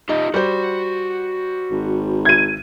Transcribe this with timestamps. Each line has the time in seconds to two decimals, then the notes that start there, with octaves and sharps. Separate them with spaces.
0.09 D#4 F4 G4 D#5
0.34 G3 F#4 C5
1.70 G#1
2.25 G#6 D#7